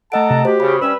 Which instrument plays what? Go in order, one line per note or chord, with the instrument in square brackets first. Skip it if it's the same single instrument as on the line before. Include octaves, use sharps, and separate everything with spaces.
[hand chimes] A3 D#5 D7 [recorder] A4 [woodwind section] F#5 A5 A#5
[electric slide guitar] C3
[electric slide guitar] F#4 [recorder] G4 [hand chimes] C5
[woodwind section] C#3 [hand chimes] B5
[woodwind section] G3 E5 E6 [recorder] C#4 [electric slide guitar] B4